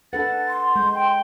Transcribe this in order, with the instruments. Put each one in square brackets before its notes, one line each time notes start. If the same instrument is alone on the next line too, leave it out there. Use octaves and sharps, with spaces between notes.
[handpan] D4 A4 B4 [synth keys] F#5 [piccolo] A6
[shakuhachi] C6
[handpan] G#3 [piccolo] G6
[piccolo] G5